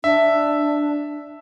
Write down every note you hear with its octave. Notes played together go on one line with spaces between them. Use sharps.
D4 E5